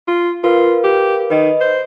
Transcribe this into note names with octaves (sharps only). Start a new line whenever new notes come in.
F4
F4 A#4 B4 F5
G4
D#3 B4 D#5
C5